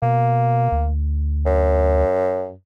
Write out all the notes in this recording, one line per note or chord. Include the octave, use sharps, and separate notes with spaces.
B2 A#3
D2
F#2